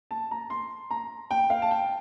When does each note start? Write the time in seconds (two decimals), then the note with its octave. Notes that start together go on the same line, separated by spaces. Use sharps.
0.11 A5
0.31 A#5
0.50 C6
0.91 A#5
1.31 G5
1.50 F5
1.62 A5
1.71 G5